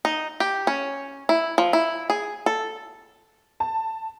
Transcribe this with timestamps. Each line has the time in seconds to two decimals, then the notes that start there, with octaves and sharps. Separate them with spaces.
0.05 D#4
0.40 G4
0.67 C#4
1.29 E4
1.58 F3
1.73 E4
2.10 G#4
2.46 A4
3.60 A5